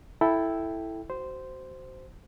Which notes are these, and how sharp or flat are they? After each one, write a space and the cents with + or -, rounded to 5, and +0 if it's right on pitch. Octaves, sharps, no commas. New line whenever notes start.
E4 +0 A4 +0 G5 +0
F#4 +30 C5 -10